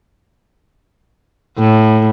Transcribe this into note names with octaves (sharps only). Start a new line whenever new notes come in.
A2